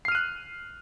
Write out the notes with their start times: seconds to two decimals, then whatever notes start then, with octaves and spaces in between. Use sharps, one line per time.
0.05 C7
0.08 F6
0.12 D#7
0.15 F#6